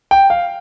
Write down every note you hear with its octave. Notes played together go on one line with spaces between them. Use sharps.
G5
F5